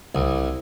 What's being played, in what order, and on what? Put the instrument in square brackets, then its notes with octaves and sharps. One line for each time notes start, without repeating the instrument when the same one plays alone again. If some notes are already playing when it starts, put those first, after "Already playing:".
[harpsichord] C2